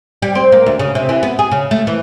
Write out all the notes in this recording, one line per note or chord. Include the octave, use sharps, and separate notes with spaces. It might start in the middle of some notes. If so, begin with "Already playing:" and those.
G3
C4
A#3
D2
C#3
C3
E3
B3
G#4
C#3
A3
E3